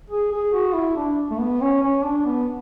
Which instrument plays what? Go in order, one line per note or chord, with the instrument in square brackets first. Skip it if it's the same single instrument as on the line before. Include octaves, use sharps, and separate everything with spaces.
[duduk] G#4
G#4
F#4
E4
D4
A3
B3
C#4
C#4
D4
B3